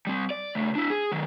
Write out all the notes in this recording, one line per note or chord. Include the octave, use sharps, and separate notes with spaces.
G3 C4
D5
C#3 A3
D4 E4
G#4
D#3 F#3